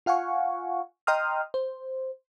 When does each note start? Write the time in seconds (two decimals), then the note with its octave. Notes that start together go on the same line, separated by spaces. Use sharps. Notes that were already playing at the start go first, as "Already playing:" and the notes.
0.06 F4 F5 F#5 G#5 C#6
1.07 D#5 G5 A#5 C6 D#6 F6
1.54 C5